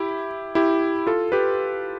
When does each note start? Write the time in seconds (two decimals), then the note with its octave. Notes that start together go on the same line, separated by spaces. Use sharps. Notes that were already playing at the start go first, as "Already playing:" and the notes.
Already playing: E4 G4
0.55 E4 G4
1.07 F4 A4
1.32 G4 B4